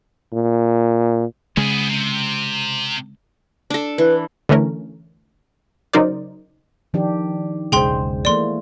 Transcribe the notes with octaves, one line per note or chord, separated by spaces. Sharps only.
A#2
C#3 G#3 B3 G#4
C3
D4 A4
E3 B4
D3 E3 A3 C#4 A#4
C#3 F#3 D#4 A#4 C5 D5
D#3 F3 D4 G4
E1 B1 C#3 G#3 G#4 C5 G5 C6
E3 A3 A#3 D5 C6